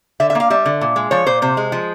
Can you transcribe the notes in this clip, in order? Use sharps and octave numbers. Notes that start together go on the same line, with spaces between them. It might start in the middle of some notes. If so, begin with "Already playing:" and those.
D3 E5
E5
A#3 F5
G3 E5
D3
A#2
G#3
F3 C#5
A#2 C5
C3 C5
G#3
F3